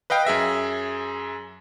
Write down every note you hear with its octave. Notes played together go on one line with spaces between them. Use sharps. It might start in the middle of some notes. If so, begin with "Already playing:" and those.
B4 D#5 F5 G5
F#2 G#4 E5 A#6